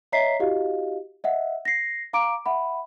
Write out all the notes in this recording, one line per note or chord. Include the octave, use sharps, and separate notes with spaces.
C#5 D#5 E5 A#5 B6 C7
E4 F#4 G4 D#5 F5
D#5 E5 F#5
A#6 C7
F5 A#5 D6 D7
E5 F#5 B5